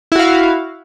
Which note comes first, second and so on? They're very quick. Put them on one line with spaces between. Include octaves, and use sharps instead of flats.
E4 F#4 F5